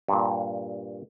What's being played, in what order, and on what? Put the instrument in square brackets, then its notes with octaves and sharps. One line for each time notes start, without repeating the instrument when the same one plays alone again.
[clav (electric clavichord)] G2 A#2